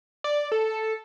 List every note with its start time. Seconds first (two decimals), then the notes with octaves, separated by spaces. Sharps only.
0.24 D5
0.52 A4